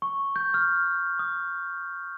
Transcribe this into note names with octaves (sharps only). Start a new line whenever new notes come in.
C#6
G6
F6
D#6